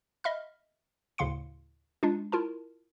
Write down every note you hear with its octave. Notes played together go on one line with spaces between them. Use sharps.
D#5 E5 B5 F6
D2 A2 C#3 F5 C6 C#7
G#3 D4 D#4 F4
E4 F4 A#4 A5